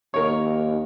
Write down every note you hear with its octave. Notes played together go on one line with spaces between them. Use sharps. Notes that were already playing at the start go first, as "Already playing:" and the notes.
D#2 A#4 C#5